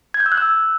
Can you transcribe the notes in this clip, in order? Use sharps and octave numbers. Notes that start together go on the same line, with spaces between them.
G#6
G6
E6
F#6
E6